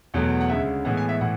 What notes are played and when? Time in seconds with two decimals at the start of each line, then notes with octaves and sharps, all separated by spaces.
0.14 E2 B2 F#3 A3
0.41 F#5
0.49 D2 C#3 G#3 E5
0.85 A2 E3 G#3 B3 F#5
0.97 G#5
1.09 E5
1.21 A2 E3 F#5